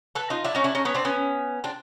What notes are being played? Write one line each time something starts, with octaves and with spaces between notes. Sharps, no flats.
A4 B4
D#4 F4
D4 E4
C#4 D#4
D4 E4
C#4 D#4
B3 C#4
C4 D4
B3 C#4
C4 D4